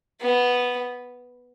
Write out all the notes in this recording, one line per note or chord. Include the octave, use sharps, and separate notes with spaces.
B3